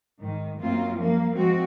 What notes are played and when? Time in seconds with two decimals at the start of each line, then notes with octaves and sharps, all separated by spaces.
0.18 G#2 D#3
0.60 F#2 A#3 C4 F4
0.97 F3 G3 A#3
1.35 F3 G#3 C4 F#4